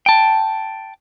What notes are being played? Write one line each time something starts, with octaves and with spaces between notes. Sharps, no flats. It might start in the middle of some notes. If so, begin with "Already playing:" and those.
G5 A5